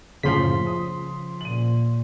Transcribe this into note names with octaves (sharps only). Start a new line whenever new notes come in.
F#1 A2 C#3 F3 C6 B6
D#6
A#2 D#7 F#7